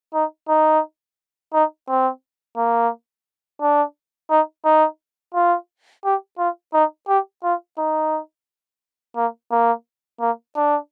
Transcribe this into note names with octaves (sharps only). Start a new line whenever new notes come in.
D#4
D#4
D#4
C4
A#3
D4
D#4
D#4
F4
G4
F4
D#4
G4
F4
D#4
A#3
A#3
A#3
D4